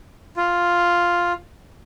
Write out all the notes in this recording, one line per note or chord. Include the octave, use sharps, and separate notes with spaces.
F4